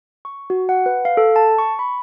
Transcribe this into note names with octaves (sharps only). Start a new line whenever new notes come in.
C#6
F#4
F#5
B4
F5
A4
A5
C#6
B5